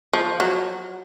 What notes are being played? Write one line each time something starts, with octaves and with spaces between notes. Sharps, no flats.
F3
F#3